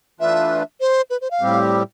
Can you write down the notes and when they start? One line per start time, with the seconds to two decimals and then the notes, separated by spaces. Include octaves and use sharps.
0.20 E3 A3 D4 F4 B4 E5
0.80 C5
1.10 B4
1.21 C5
1.31 F5
1.41 A2 G3 C4 G4